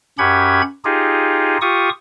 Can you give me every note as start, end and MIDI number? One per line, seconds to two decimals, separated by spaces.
0.19 0.62 42
0.19 0.62 61
0.19 0.62 67
0.19 0.62 78
0.19 0.62 83
0.19 0.62 92
0.85 1.58 63
0.85 1.58 65
0.85 1.58 67
0.85 1.58 68
1.62 1.89 65
1.62 1.89 67
1.62 1.89 85
1.62 1.89 87